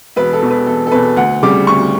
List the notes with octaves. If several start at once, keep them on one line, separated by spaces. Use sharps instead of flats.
E1 B4
A4
E2 B2
B4
E1 A4
A4
E2 B2 B4
D2 F#5
C#3 G3 D6
D2 C#6